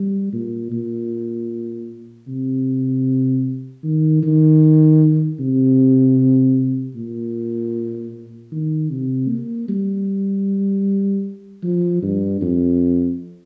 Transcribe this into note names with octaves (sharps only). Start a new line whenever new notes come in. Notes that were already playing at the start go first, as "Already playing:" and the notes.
Already playing: G3
A#2
A#2
C3
D#3
D#3
C3
A#2
D#3
C3
A#3
G3
F3
G2
F2